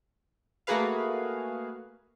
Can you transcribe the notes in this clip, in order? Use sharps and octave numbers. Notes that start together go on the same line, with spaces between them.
A3 A#3 F#4 G#4 B4 F5